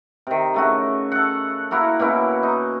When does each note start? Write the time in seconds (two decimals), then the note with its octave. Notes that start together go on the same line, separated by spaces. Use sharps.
0.27 C3 D#3
0.54 C#3 A3 F#4
1.12 A4 F#5
1.71 A#3 E4 F#4 A#4
1.99 B2 A#3 C#4 E4
2.43 D#4